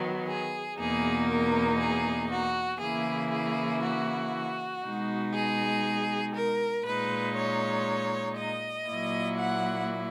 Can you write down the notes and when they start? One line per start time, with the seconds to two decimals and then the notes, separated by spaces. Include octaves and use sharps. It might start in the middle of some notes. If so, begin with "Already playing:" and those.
Already playing: D#3 F#3 B3
0.28 G#4
0.79 E2 B2 A#3 D#4 G#4
1.29 A#4
1.80 G#4
2.30 F#4
2.81 C#3 E3 A#3 E4 G#4
3.32 G#4
3.82 F#4
4.84 B2 G#3 D#4
5.34 G#4
6.35 A#4
6.86 A#2 G#3 D#4 B4
7.36 C#5
8.37 D#5
8.88 A#2 F#3 A#3 E4
9.38 F#5